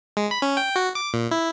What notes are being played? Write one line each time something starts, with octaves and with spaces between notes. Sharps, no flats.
G#3
B5
C#4
G5
F#4
D6
A#2
E4